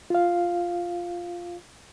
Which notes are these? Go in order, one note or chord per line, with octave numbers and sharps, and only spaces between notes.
F4 F5